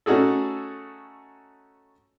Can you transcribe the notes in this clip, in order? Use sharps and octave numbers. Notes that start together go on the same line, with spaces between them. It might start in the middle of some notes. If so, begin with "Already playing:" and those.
A3 C#4 D#4 F#4 G#4 A4